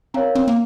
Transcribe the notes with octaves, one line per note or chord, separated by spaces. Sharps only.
C4 A#4 C#5 F5 A#5
C4
A#3